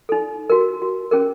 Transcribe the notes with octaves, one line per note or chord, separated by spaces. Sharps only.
D#4 A4
F#4 A#4
F#4
C#4 G#4 A#4